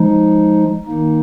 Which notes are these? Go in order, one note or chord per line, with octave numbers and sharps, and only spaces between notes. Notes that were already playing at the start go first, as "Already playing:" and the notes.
Already playing: F3 G#3 D#4
D#3 A#3 D#4